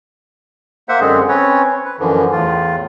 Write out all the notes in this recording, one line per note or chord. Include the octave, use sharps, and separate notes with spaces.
A#3 C5 E5 F#5
F#2 D3 G#3 C4 G#4
C4 C#4 B4 C#5
B4
F#2 D3 E3 F3
E2 A2 F4